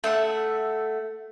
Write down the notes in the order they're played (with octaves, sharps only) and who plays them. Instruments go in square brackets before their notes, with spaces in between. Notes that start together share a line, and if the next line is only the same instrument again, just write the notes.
[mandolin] A3 E5 F#5